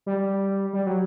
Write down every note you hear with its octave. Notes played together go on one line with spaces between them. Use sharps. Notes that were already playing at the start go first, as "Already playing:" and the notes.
G3
G3
F#3